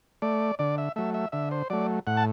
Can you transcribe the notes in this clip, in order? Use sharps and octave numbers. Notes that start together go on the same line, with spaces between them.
A3 D5
D3 D5
E5
F#3 A3 E5
E5
D3 E5
C5
F#3 A3 D5
A2 F#5
A5